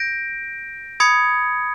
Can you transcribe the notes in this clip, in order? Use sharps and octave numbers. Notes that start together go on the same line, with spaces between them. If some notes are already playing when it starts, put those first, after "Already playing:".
Already playing: G6 A#6 D7
B5 D#6 G#6 C#7